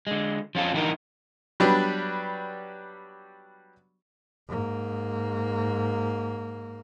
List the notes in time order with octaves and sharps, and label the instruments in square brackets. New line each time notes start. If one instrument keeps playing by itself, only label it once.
[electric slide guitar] D3 G#3
F3 C#4 F4 A4
D3 E3 A3 D4 D#4 A#4
[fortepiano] F#3 G3 B3 D4 B4 D5
[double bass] G#2 A#3